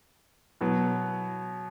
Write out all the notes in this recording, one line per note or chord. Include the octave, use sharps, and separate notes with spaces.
B2 F#3 B3 E4